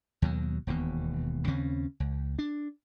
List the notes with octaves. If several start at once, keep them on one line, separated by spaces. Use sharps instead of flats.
D#2 B2 F#3
E1 D#2 B2
D#2 C#3 C4 C#4
C#2
D4